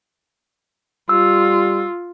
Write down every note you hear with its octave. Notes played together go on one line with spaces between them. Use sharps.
G3 F4 E6